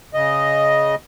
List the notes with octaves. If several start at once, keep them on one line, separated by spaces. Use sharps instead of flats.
C#3 D#5